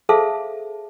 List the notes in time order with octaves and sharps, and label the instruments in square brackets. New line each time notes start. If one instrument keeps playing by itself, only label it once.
[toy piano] G#4 A4 C5 E5 F5 A5